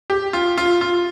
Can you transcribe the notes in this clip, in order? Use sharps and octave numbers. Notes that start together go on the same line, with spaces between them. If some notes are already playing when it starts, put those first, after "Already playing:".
G4
F4
F4
F4